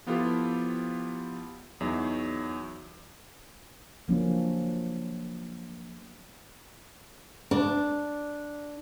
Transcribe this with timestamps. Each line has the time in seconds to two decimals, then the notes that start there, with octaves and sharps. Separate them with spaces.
0.06 F3 B3 E4 F4 G4 A4
1.80 E2 F#3 D#4 E5
4.08 F3 F#3 A#3 C#4 D4
7.51 D4